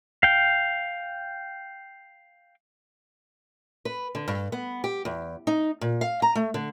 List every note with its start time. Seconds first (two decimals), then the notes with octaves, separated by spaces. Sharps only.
0.23 F5 G5
3.85 B4
4.15 D3
4.28 G2
4.52 B3
4.84 G4
5.05 E2
5.47 D#4
5.81 A#2
6.01 F5
6.22 A#5
6.35 A3
6.54 D3